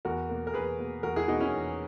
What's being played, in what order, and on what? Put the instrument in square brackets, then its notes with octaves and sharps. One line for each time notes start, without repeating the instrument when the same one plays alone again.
[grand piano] E2 F#4 A#4
B2 A#3
A#4
E2 G#4 B4
B2 A#3
E2 F#4 A#4
E4 G#4
B2 A#3 D#4 F#4
C#4 E4
E2